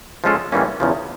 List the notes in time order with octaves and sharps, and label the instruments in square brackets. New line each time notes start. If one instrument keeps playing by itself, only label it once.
[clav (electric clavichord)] F3 G#3 C#4 F4 A4
A2 E3 G3 A#3 C#4
E2 C#3 F3